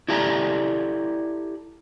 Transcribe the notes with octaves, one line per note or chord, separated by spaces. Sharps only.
E4 G4 A4 D5 G#5 A#5